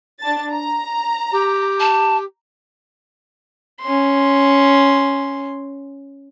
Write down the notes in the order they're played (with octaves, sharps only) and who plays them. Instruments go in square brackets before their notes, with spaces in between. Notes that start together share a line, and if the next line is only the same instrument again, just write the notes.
[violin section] D4 A5 A6
A#5
[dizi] G4
[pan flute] A5
[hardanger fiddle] C#4 C6